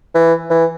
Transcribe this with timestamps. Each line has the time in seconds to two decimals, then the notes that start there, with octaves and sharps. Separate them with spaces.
0.15 E3
0.50 E3